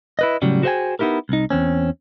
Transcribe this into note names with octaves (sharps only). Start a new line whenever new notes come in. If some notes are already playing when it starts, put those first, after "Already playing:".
E4 B4 D#5
A2 C#3 F#3 G3 C#4
F#4 G#4 C5 E5 G5 G#5
B3 D#4 E4 G4 A#4
C2 D#4
E2 C4 C#4